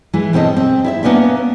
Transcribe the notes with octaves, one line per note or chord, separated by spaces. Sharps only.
E3 G#3 E4
B2 C4 A4 C#5 D#5
C4
E4 D5 E5
A#3 B3 C#4 D4 E5